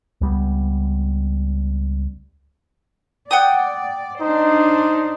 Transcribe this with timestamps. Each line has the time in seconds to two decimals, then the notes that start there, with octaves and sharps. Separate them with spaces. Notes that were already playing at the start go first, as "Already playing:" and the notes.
0.21 C#2 G3 B3
3.31 D5 F#5 G5 D#6
4.21 D4 D#4 C5